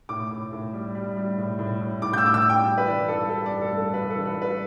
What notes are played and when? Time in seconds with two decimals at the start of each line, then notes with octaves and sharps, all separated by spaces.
0.09 A2 D6
0.31 A2
0.52 A2
0.73 G3
0.95 G3
1.17 G3
1.38 A2
1.59 A2
1.80 A2
2.02 A2 D6
2.13 G6
2.18 E6
2.23 A2 D6
2.34 E6
2.45 G3 G5
2.65 G3
2.78 B4
2.86 E3 D5
3.08 G2 A4
3.29 G3 A4
3.46 D5
3.51 G2
3.62 A4
3.73 G2
3.78 A4
3.94 G2 B4
4.10 A4
4.16 E3
4.26 B4
4.36 G3
4.42 B4